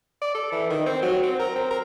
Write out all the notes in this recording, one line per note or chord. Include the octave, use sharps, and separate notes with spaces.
D5
A4
E3
D#3
C4
F#3
C4
A#4
C4
A#4